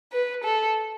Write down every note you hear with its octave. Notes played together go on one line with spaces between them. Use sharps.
B4
A4